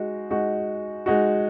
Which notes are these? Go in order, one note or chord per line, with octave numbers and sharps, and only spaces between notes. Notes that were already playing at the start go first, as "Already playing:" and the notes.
Already playing: G#3 D#4 F#4
G#3 D#4 F#4
G#3 D#4 F#4